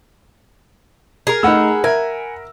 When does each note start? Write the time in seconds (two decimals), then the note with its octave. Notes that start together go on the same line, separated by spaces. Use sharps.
1.27 G#4 A#4
1.43 A3 D#4 F#5 B5 E6
1.84 A#4 E5 G#5